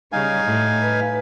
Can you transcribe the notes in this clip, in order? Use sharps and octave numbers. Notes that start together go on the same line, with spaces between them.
C#3 G3 D#4 F5 G#5
A2
B4